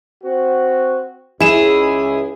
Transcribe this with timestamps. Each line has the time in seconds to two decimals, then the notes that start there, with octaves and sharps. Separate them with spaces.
0.23 C4 F#4
1.40 C#2 E4 G#4 E7